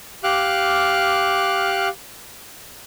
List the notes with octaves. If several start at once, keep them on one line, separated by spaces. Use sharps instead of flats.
G4 F5 D6 F6 F#6